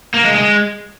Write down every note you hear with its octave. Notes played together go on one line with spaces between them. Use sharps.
A#3
G#3
G#3